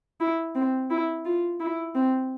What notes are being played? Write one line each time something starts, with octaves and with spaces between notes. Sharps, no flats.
E4
C4
E4
F4
E4
C4